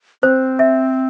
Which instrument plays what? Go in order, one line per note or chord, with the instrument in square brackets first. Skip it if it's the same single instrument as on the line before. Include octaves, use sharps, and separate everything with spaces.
[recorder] C4 [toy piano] C5
[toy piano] E5